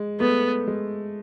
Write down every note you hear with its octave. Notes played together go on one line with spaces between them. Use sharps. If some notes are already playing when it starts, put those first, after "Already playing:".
Already playing: G#3
A3 B3
G#3